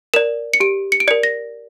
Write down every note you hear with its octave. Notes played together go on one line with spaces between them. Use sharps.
A#4 D5 E7
C#7
G4 D7
C#7
D7
A#4 D5 C#7
A#6